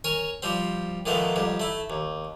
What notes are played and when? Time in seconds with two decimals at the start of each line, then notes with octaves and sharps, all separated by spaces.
0.04 A#4 C#5 G#5
0.43 F3 G3 C4
1.06 A#2 D#3 F3 G#3 A3 B3
1.36 F2 G#2 G3
1.60 A3 E4
1.90 D#2